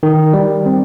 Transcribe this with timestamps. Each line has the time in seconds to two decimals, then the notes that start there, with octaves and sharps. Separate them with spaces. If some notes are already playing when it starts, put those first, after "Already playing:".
0.03 D#3
0.33 G3
0.66 C4